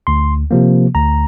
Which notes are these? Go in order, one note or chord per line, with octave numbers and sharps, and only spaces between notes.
D2 C6
C3 F3 A#3
D2 A#5